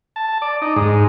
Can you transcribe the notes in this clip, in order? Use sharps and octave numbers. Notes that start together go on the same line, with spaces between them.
A5
D5
D#4
G#2